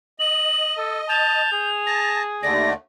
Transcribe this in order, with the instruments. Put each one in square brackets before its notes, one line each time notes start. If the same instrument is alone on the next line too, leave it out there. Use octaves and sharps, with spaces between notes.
[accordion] D#5 [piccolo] F#7
[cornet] A4
[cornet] A5 [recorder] G6 [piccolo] F7
[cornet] G#4
[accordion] A5 [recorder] A#6
[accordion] D#2 D3 A3 [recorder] D5 [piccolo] A#6